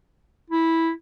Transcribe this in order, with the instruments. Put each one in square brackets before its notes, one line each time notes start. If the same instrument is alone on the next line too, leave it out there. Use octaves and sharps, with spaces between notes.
[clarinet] E4